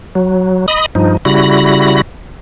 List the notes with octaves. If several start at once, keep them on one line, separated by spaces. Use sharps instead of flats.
F#3
D#5 B5 D#6
G2 F3 D#4
C#3 G3 E4 F#4 B5 A#6